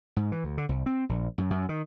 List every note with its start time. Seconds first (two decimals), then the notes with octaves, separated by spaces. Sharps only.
0.16 G#2
0.32 E3
0.44 D2
0.58 D3
0.69 C2
0.86 C4
1.09 A#1
1.38 F#2
1.50 F#2
1.69 D#3